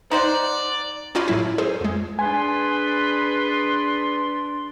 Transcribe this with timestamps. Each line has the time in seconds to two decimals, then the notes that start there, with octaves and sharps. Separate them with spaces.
0.11 D#4 C5 D5 F#5
1.15 C#4 D#4 F4 D5 G#5 B5
1.28 A2 F#3 E4
1.58 G#4 A4 C5
1.81 F2 G#3
2.19 D4 G#4 B4 G#5 C6